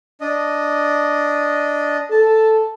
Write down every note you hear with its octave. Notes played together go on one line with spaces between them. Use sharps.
D4 D#5
A4 A5